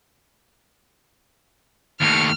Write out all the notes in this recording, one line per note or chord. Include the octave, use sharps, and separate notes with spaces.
D#2 A2 F6